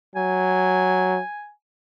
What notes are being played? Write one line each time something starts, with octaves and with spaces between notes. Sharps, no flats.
F#3 G#5